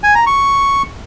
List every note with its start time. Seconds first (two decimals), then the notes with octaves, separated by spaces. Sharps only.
0.03 G#5
0.15 A#5
0.26 C#6